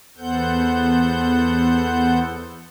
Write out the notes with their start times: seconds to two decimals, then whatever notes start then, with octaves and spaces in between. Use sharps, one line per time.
0.18 E2 B3 A4 C5 F#5 G6